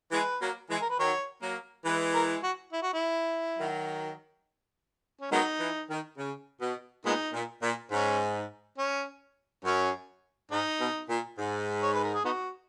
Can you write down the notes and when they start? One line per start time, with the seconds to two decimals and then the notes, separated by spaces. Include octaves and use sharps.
0.12 E3 G#3 B4
0.41 F#3 A#3
0.70 E3 G#3
0.81 A#4
0.90 B4
0.99 D#3 F#3 C#5
1.43 F#3 A#3
1.85 E3 G#3 B4
2.14 A#4
2.43 F#4
2.73 E4
2.83 F#4
2.93 E4
3.59 D#3 F#3
5.21 C#4
5.31 D#3 F#3 G#3 B3 D#4
5.60 E3
5.90 D#3
6.18 C#3
6.61 B2
7.05 A#2 G#3 B3 D#4
7.33 A#2
7.63 A#2
7.92 G#2 C#4
8.78 C#4
9.64 F#2 C#4
10.51 G#2 D#4
10.80 B2
11.10 A#2
11.38 G#2
11.82 C#5
11.93 B4
12.04 A#4
12.14 G#4
12.25 B3 D#4 F#4